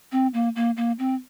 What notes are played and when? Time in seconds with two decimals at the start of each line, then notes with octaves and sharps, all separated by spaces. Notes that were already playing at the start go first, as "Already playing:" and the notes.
0.12 C4
0.34 A#3
0.56 A#3
0.77 A#3
0.99 C4